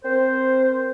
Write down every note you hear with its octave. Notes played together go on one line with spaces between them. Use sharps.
C4 A#4 C5